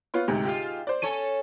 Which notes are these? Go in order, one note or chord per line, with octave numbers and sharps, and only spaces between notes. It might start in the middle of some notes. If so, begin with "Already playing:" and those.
B3 F4 C#5
D2 G#2 C3
G#2 F4 G4
C5 D5
C#4 A4 C#5 D#7